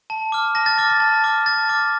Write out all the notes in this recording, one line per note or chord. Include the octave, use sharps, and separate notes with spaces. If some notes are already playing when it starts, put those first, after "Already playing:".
A5
D6 F6
A5 A#6
A6
D6 F6 A6
A6
A5
D6 F6
A5 A6
D6 F6